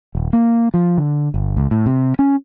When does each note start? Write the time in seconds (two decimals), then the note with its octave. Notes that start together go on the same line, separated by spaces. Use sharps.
0.15 D#1
0.33 A#3
0.74 F3
0.98 D3
1.34 G1
1.57 C#2
1.71 A2
1.86 C3
2.19 C#4